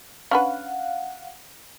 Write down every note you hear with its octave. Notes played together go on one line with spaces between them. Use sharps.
C#4 D4 B4 F5 F#5